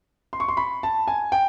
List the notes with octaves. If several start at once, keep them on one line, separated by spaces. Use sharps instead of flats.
C6
C#6
C6
B5
A5
G#5
G5